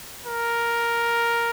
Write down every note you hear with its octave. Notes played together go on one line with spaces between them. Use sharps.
A#4